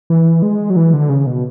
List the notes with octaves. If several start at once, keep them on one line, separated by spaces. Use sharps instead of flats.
E3
G#3
F#3
E3
D3
C#3
B2